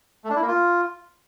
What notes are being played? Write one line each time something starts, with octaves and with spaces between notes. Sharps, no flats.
A3
D4
E4
A#3
F4